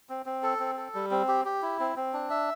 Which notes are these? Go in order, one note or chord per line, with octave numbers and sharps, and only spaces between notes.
C4
C4
A4
C4
A4
G3
C4
G4
G4
E4
C4
C4
D4
E5